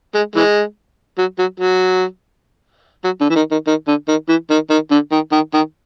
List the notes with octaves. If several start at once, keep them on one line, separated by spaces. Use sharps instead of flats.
G#3
E3 G#3
F#3
F#3
F#3
F#3
D3
E3
D#3
D#3
D#3
D3
D#3
E3
D#3
D#3
D3
D#3
D#3
D#3